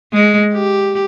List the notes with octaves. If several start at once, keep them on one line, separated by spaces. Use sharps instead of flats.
G#3
G4